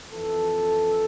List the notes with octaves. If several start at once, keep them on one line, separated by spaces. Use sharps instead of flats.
F2 E3 A4